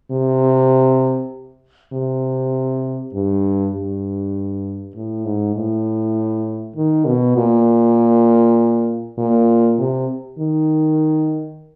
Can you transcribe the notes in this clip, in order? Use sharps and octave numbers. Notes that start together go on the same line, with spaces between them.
C3
C3
G2
G2
A2
G#2
A2
D#3
B2
A#2
A#2
C3
D#3